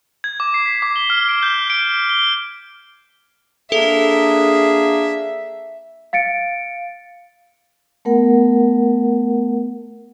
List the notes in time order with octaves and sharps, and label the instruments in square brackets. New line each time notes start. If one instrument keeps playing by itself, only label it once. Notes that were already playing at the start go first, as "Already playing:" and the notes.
[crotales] G#6
D6
C7
B6
D6
G7
F6
D7
G6
D7
G7
[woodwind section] A#3 D4 G#4 [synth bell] A4 [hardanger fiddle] E5
[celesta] F5 A6 C#7 D7
[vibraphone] A3 B3 A#4 F#5